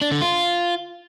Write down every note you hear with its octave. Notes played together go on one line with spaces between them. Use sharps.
D4
D3
F4